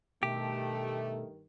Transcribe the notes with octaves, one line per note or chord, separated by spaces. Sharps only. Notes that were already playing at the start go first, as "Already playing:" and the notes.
G2 B2 D#3 A3 G4